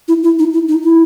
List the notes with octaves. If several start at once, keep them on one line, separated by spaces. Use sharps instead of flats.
E4
E4
D#4
E4
D#4
E4